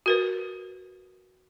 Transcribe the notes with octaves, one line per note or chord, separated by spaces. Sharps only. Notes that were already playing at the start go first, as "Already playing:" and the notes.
F#4 A#4 B4